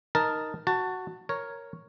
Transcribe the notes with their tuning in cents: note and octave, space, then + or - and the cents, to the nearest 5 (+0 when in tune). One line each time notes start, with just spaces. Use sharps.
D#4 +0 A#4 +0 A5 +0
F#4 +0 A5 +20
A#4 +0 C#5 +0